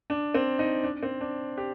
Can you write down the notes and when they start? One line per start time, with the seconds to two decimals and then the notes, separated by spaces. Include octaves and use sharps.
0.10 D4
0.34 C4
0.59 D#4
0.83 D4
1.03 C4
1.21 D4
1.58 G4